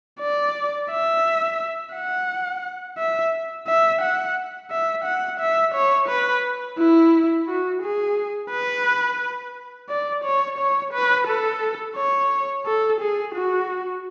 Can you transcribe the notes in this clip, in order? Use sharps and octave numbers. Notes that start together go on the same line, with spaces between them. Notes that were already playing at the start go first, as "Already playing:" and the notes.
D5
E5
F#5
E5
E5
F#5
E5
F#5
E5
C#5
B4
E4
F#4
G#4
B4
D5
C#5
C#5
B4
A4
C#5
A4
G#4
F#4